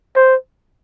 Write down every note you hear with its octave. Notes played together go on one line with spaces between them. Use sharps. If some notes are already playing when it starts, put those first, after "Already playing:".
C5